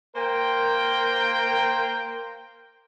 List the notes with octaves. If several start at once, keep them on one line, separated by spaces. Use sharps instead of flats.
A#3 A#4 C5 G5